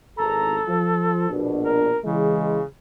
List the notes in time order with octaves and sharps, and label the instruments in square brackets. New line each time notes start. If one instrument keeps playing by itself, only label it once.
[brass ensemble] G#1 E2 A#5 [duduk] A4
[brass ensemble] F3
A#1 B2 D4
[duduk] A#4
[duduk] C#3 [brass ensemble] E3 G#3